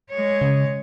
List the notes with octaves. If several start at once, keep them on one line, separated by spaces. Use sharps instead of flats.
G#3 C#5
C#3